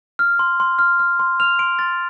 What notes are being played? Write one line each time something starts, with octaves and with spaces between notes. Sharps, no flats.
F6
C6
C6
F6
F6
C6
F6 F7
C6 D7
C6 A6